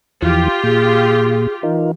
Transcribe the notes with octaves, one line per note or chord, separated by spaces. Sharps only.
E2 E3 F3 F4 G4
A#2 G#4
E3 D#4 F4 A#4